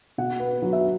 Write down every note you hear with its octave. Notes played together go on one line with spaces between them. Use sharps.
B2 F#5
B3
F#3
E5